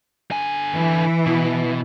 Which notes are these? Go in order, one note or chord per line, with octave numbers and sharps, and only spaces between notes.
D3 G#5
E3
B2